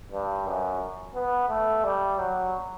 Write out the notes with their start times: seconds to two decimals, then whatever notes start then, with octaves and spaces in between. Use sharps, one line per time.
0.12 G2
0.46 F#2
1.15 B3
1.49 A3
1.84 G3
2.18 F#3